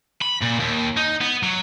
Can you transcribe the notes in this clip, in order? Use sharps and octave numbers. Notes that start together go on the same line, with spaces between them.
B5
A#2
D#2
D#4
B3
F#3